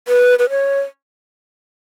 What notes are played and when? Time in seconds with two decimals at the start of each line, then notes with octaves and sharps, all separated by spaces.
0.08 B4
0.39 B4
0.50 C#5